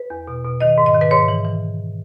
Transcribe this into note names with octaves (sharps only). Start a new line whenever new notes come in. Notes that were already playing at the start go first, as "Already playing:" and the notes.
Already playing: B4
E2
B2
B2
D#3 D#5
G#2
D#5
D#3
B4
G#2 C#5
E3
E3